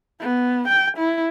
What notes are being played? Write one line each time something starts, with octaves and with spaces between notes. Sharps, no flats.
B3
G5
E4